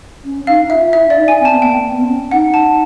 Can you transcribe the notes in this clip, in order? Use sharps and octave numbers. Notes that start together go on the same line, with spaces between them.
C#4
D#4 F5
F4 E5
E4 E5
D4 D5
D#4
G#5
C4
A5
B3
A#3 G5
B3
C4
C#4
D#4 F#5
A5